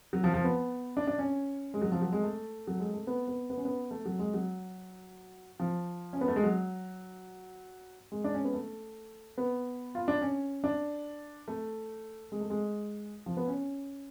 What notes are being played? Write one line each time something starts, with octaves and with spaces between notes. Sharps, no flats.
F#3
F3
F3
B3
D4
D4
C#4
G#3
F#3
F3
F#3
G#3
A3
F#3
G#3
A3
B3
B3
B3
C#4
B3
A3
F#3
G#3
F#3
F3
C#4
B3
A3
G#3
F#3
G#3
D4
C#4
B3
A3
B3
F4
D4
C#4
D4
A3
G#3
A3
G#3
F3
B3
C#4